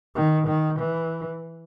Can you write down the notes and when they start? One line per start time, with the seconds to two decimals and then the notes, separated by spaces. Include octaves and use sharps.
0.15 D#3
0.47 D#3
0.79 E3